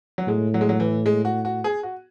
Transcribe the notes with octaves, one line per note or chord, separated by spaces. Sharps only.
F#3
A2 G#3
F#3
G#3
F#3
E3
G#3
F#4
F#4
G#4
F#4